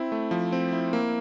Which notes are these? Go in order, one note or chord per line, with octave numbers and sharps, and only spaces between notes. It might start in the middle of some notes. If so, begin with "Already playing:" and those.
Already playing: C4 E4
A3
F3
C4
E4
A#3